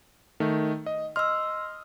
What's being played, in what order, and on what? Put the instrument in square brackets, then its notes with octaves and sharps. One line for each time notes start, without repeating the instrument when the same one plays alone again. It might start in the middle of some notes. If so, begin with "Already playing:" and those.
[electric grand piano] D#3 A3
D#5
[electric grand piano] D#5 F6 [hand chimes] C6 E6